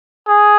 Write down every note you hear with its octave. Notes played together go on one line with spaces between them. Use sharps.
G#4